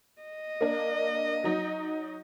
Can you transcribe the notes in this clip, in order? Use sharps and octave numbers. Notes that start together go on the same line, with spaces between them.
D#5
A#3 D4
F#3 D#4